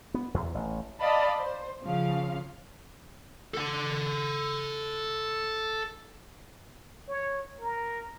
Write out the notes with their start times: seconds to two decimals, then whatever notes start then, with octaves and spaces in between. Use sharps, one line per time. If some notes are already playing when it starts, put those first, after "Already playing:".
0.14 B3
0.34 E2
0.55 A1
1.00 D5 D#5 F5 A5 B5
1.38 C5
1.84 C#3 F3 F5
3.54 A4 F#5
7.08 C#5
7.60 A#4